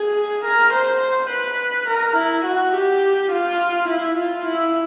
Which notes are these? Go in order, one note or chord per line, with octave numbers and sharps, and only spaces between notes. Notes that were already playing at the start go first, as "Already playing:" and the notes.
Already playing: G#4
A#4
C5
B4
A#4
E4
F#4
G4
F4
E4
F4
E4